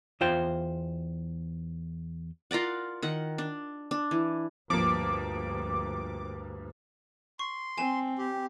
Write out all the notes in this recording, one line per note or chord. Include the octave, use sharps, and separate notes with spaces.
E2 F4 C5 G5
F4 A#4 D5 F#5
D#3 F#5
D4
D4
E3
D2 G2 F3 A#3 D6
C6 C#6
C4 G#5 E7
G4